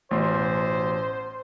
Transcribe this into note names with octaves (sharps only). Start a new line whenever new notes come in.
A1 B2 C5 C6